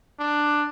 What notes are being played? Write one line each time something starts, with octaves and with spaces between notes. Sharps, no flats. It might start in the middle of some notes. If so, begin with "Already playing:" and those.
D4